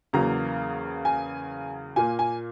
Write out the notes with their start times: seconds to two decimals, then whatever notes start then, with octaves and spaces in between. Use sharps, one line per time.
0.13 E2 C#3 F#3 A#3 A#5
1.05 G#5
1.96 A#2 A#3 G#5
2.19 G#5